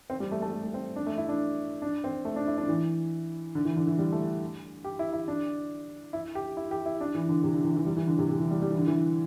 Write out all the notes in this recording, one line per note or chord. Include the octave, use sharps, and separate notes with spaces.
C4
G3
A3
A3
G3
A3
C4
D4
A3
E4
D4
D4
C4
A3
D4
E4
D4
E3
D3
E3
D3
E3
G3
A3
G4
E4
E4
D4
E4
G4
E4
G4
E4
D4
E3
D3
C3
D3
E3
E3
G3
E3
D3
C3
C3
E3
G3
G3
E3
D3
E3